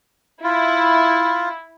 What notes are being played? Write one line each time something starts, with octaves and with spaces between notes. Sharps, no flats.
E4 F4